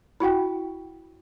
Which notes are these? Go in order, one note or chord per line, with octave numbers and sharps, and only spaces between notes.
E4 F#4 F#5 G5